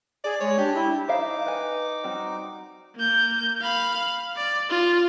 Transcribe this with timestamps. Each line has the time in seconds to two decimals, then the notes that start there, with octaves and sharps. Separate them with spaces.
0.24 G#4 D5
0.40 G#3 C#5
0.58 D4 G4
0.74 E4
1.08 D#4 C5 E5 F5 D6
1.46 B4 G#5
2.04 G3 C4 F#4
2.95 A#3 G6
3.61 F5 B5
4.36 D5
4.70 F4